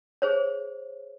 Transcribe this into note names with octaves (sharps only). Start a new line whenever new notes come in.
G#4 C5 C#5